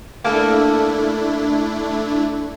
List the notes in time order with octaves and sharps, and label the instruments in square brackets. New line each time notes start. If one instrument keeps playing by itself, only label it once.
[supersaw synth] A3 D4 E4 [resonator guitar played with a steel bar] A#3 A4